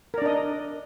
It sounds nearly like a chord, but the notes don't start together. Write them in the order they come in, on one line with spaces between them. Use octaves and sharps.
A#4 D5 D4 D#5